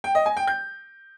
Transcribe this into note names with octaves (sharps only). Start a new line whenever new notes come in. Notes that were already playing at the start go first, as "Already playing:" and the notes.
G5
D#5
G#5
G5
G6